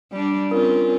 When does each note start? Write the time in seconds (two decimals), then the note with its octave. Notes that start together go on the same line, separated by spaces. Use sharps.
0.12 G3 D4
0.51 C4 C#4 F4 A#4